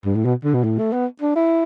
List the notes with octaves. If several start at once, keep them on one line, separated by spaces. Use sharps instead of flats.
G2
A2
B2
D3
B2
A2
A3
B3
D4
E4